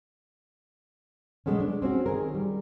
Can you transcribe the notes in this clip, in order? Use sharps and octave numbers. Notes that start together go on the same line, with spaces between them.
B2 F#3 G#3 A3 B3 C#4
D4
C4 C#4 F#4
D#3 G#4 A#4
G3